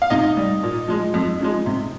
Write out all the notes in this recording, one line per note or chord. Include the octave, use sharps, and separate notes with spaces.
F5
C3 D#4 D#5
G3
A#2
F3 G#3
F2
C#3 F3 G#3
C3